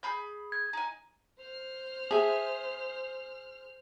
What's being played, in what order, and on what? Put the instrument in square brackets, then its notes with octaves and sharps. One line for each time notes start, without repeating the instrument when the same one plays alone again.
[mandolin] G#4 B5 G6
[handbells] G#6
[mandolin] D#4 G#5
[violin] C5 F6
[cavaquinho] G#4 E5